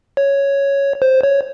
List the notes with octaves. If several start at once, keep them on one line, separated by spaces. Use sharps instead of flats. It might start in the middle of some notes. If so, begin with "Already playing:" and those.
C#5
C5
C#5